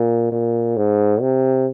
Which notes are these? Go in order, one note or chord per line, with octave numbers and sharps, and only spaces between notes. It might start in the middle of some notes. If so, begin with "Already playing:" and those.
Already playing: A#2
A#2
G#2
C3